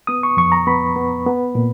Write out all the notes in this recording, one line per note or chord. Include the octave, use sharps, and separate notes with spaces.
B3 D#6
C#6
F2 C#6
A#5
B3 B5
B3
B3
A#2